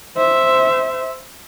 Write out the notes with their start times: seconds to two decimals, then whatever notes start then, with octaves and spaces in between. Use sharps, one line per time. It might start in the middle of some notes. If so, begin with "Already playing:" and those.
0.17 C5 E5